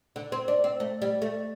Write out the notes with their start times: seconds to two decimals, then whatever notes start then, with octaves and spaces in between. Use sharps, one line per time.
0.16 D3
0.32 C4
0.48 D4
0.64 C4
0.80 A3
1.02 G3
1.22 A3